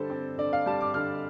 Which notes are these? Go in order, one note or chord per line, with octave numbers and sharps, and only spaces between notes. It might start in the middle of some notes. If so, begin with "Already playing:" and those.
Already playing: D3 G3 A4 C5
C4
D3 D5
F5
G3 A5
D6
D3 F6